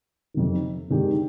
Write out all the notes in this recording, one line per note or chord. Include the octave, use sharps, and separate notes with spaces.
F2 C3 D#3
C3 D#3 G#3 D4 G4